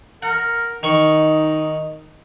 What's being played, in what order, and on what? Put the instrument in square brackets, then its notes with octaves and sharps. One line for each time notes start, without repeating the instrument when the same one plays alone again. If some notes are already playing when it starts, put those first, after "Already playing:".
[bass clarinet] A#4 [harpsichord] F#5
[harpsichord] D#3 C#6 [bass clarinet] D#4